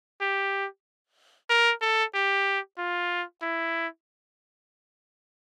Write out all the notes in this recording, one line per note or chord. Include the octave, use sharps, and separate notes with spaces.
G4
A#4
A4
G4
F4
E4